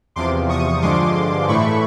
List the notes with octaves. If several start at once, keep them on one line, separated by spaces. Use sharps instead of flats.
E2 C3 F3 C6 D6
C#6 D#6
G2 D3 F3 G#3 C6 D6
A2 E3 A3 B5 C#6